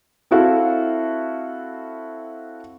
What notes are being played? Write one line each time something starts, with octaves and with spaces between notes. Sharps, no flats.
C4 E4 F#4 A4 F5